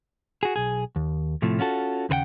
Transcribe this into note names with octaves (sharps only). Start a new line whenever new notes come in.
F#4 G#4
B1 G#4
D#2
A2 C3 F3 A3
C#4 F4 F#4 A4
D#2 C#3 B4 F#5 G5